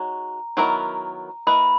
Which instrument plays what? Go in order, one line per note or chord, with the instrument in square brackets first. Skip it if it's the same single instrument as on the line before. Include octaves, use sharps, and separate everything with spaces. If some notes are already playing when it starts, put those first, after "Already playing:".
Already playing: [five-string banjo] G#3 D#4 F#4 C#5 [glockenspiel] A#5
[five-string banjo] D#3 F#3 B3 E4 A#4
[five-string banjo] A#3 E4 B4 D#5 [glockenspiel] B5